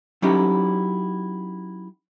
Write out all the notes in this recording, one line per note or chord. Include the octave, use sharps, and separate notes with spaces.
F#3 C#4 D#4 E4 G4